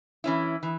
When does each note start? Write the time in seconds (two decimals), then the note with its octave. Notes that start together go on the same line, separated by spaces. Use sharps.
0.24 E3 C#4 E4
0.63 E3